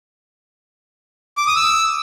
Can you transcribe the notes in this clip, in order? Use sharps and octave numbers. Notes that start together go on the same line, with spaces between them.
D6
D#6
E6